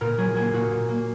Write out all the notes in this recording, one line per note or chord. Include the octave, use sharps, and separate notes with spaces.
A#2 A#4
F#3 G#4
A#3 G#4
A#2 F#4
A#2
A#3